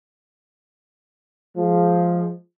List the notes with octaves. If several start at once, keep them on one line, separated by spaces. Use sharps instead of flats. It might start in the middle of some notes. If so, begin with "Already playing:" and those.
F3 G#3